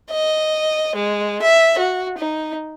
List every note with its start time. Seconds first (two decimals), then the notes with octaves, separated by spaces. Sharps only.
0.11 D#5
0.95 G#3
1.42 E5
1.79 F#4
2.18 D#4